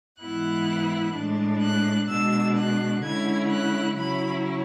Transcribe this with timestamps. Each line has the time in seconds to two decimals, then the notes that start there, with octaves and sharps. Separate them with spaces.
0.21 G#2 E3 B3 E4 F#6
1.15 A2 G#3 D4
1.62 F#6
2.09 B2 G#3 D4 E6
2.57 F#6
3.04 D3 G#3 C#4 E4 G#6
3.51 F#6
3.98 C#3 F#3 C#4 E4 B5